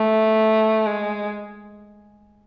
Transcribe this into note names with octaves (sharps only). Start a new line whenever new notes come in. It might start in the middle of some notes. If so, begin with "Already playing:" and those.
Already playing: A3
G#3